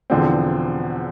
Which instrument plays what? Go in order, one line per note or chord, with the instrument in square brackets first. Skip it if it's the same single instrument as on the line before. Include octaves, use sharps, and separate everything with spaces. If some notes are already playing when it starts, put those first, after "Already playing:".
[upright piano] E1 E2 D3 F3 C4